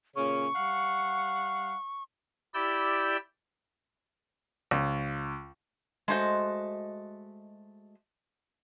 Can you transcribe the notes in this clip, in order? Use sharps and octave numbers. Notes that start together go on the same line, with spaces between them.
A#2 C#3 C#4 C#6
G3 F5 F#5
E4 G4 D5 E6 G6
C#2
G#3 A3 F#4 C5 D#5